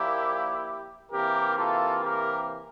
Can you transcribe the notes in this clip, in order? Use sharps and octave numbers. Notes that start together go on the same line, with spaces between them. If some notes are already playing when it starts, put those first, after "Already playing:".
Already playing: A#2 F3 A#3 E4 G4
C3 E3 A#3 G4 A#4
F4 A4
G4 A#4